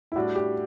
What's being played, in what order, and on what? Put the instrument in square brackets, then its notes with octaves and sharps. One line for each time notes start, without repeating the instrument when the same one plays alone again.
[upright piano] E4
[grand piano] A2 G3 D4 [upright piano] F#4
[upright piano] G4